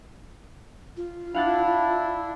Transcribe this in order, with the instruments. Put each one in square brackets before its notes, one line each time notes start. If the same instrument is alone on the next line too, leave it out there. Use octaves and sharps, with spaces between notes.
[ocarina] F4
[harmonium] D4 E4 [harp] F5 F#5 A5